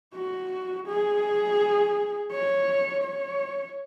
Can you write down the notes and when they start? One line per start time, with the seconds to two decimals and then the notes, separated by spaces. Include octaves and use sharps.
0.15 F#4
0.87 G#4
2.32 C#5
3.03 C#5